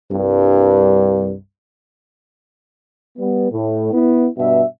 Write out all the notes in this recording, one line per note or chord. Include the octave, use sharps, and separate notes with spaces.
C2 G2
G3 B3
A2
B3 E4
G2 B2 E5